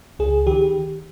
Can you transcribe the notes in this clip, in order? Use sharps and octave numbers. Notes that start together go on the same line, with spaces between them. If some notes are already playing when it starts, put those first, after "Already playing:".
C#2 G#4
D#3 G4